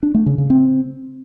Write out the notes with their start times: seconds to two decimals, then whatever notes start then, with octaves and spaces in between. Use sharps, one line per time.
0.03 D4
0.14 A3
0.26 C#3
0.38 C#3
0.50 C4